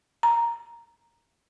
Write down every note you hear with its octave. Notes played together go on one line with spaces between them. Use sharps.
A#5